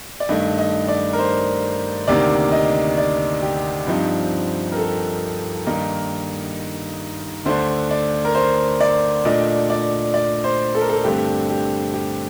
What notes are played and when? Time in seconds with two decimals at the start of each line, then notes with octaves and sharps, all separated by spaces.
0.20 D5
0.29 G2 D#3 A3 D#5
0.58 D#5
0.88 D5
1.13 A#4
1.18 C5
2.08 D2 C3 D#3 A#3 D5
2.52 D#5
2.98 D5
3.42 G4
3.87 G2 F3 C4 D#4
4.72 A#4
4.77 A4
5.66 G2 D#3 A#3 D#4 A#4
7.45 D2 D3 A3 D4 C5
7.91 D5
8.25 A#4
8.35 C5
8.81 D5
9.25 A#2 A3 D4 D#5
9.70 D5
10.14 D5
10.44 C5
10.75 A4
10.81 A#4
10.89 A4
11.04 G2 D3 A3 C4 G4
11.49 G4
11.94 G4